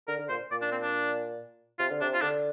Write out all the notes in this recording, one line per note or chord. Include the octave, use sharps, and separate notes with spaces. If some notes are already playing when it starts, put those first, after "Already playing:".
D3 A#4
D3
A#2 C5
A#2 D5
D4
C4
D4
C3 F4
D3
C3 D4
F4
D3 D4